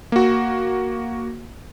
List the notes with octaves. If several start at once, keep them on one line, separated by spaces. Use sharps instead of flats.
A#3 F#4